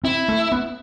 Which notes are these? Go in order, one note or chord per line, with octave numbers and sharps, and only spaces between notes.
C4 E4
A3
B3